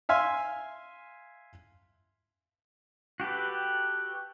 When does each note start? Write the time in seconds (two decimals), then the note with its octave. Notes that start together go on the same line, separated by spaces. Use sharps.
0.09 E5 F5 G#5 C6
3.20 F#4 G4 A4 B4